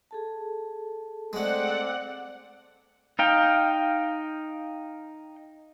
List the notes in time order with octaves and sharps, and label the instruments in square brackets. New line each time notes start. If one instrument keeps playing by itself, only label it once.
[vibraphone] G#4 A4 A5
[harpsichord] G#3 A3 [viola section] C4 D5 F#5
[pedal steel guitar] D#4 F5 G5